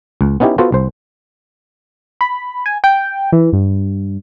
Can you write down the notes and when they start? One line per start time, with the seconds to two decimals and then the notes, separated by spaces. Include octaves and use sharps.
0.21 C#2
0.40 B3 C#4 D#4 E4 G4
0.58 B3 F4 F#4 A4 C5
0.72 C2 C5
2.21 B5
2.66 G#5
2.84 G5
3.32 E3
3.53 G2